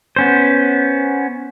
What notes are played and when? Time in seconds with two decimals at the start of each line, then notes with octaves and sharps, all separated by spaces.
0.16 B3 C#4 C5